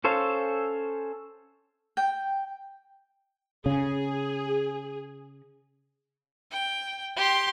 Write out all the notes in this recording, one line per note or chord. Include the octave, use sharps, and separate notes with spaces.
C#4 A4 C5 C#5 F5
G5
C#3 G#4
G5
G4 C6